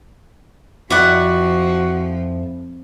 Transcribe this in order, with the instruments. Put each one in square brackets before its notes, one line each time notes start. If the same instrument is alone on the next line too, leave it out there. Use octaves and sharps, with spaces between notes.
[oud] F2 [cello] F3 [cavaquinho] E4 D5 F#5 [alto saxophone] F#4